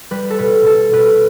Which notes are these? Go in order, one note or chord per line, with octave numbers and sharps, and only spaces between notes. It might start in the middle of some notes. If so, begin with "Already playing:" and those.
G3 B4
A4
B2 B4
B2 A4
B2 B4